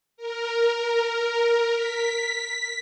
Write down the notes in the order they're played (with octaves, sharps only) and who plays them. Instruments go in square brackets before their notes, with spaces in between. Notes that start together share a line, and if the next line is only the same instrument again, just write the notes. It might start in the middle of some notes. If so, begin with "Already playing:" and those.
[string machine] A#4
B6